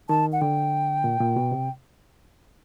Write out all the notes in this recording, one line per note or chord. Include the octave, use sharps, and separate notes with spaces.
D#3 A5
F#5
D3 G5
A#2
A#2
B2
C3